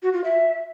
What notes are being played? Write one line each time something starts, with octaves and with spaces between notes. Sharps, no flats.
F#4
F4
E5